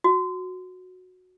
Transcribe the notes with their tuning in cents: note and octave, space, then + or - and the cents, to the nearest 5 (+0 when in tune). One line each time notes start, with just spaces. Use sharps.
F#4 -15